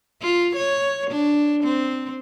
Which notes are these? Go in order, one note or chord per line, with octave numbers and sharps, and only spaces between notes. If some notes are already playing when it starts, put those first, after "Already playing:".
F4
C#5
D4
C4